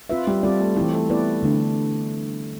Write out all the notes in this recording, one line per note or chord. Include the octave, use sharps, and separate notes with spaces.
C4 F4 B4 E5
G3
G3 C4 F4 A4 D5
A3
E3 G3 A3 C4 E4 G4
A3
B3 E4 B4 D5
D3 A3 D4